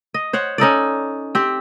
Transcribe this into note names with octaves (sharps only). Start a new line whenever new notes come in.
D#5
C5 C#5 F#5
C#4 D#4 A4 D5
C4 G4